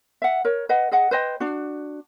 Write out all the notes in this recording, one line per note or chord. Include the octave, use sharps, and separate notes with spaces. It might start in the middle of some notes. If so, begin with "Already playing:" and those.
E5 F#5
A#4 C#5
B4 D#5 F#5
G#4 D#5 F#5
B4 C5 D#5 G5
D4 F#4